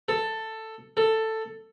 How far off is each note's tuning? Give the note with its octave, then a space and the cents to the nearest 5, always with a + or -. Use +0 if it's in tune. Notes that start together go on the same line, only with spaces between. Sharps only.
A4 +10
A4 +10